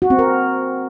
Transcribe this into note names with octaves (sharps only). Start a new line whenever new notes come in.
F#4
C4
A#4